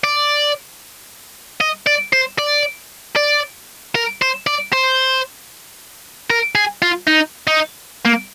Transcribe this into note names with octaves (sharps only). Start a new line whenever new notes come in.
D5
D#5
D5
C5
D5
D5
A#4
C5
D5
C5
A#4
G#4
F4
D#4
D#4
A#3